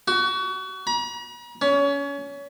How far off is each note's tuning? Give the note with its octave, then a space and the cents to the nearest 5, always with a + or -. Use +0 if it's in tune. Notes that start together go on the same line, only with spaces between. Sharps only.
F#4 +30
A#5 +45
C#4 +25